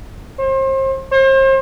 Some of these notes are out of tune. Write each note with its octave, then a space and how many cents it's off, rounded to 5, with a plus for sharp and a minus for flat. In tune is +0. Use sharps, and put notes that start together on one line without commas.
C5 +35
C5 +40